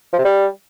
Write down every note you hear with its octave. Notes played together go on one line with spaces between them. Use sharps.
F3
C3
G3